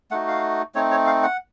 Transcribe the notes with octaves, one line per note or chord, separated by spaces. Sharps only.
A3 D#4 F#4 F#5
F5
A3 C4 D#4 C#5
C#5
F5
F#5